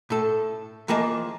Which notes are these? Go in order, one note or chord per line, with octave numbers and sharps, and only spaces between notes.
A2 A4
F2 E3 A#3 G#4 D#5 A5